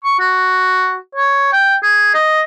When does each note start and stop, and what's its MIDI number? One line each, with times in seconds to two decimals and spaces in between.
0.04 0.14 85
0.19 0.97 66
1.15 1.52 73
1.52 1.75 79
1.83 2.14 68
2.14 2.42 75